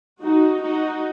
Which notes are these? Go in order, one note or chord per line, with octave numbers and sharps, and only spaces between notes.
D#4 F#4
D#4 F#4